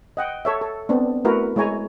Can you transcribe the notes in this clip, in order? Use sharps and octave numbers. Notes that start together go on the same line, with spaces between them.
D#5 F#5 G5
A4 C#5 E5
A4
B3 C4 D4
A3 E4 F#4 A#4 B4
G#3 E4 C#5 G#5 A#5